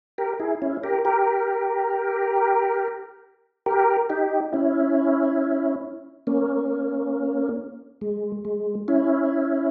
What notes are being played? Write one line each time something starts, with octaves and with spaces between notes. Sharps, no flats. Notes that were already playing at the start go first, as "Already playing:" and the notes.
G4 A#4
E4 G#4
C#4 E4
G4 A#4
G4 A#4
G4 A#4
D#4 G4
C#4 E4
A#3 C#4
G#3
G#3
C#4 E4